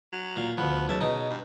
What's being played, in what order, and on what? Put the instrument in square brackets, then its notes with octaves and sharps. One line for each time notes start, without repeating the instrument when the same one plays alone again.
[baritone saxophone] F#3
[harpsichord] A#2 F5
[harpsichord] D2 F3 [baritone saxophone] B3
[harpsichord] B1 E5 A5 [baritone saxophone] C#3
[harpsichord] B2 D#4
[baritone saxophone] G2